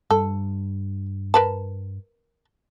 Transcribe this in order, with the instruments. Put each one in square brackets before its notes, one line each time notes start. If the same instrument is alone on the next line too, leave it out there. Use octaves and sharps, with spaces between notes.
[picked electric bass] G2 [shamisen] A4
[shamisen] A#4 B4 A5